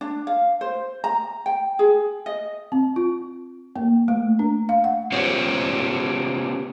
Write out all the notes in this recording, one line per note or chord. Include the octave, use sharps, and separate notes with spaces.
D4
F5
C5
A#5
G5
G#4
D#5
C4
F4
A#3
A3
D4
F5
F#5
B3 C#4 F4 G4 C5 C#5